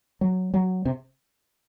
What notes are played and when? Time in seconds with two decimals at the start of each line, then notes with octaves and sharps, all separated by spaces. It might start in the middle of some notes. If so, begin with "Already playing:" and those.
0.21 F#3
0.54 F#3
0.85 C3